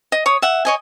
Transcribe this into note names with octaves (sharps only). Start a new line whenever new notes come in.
D#5
C#5 D#6
E5 F#5
C#5 D#5 G#5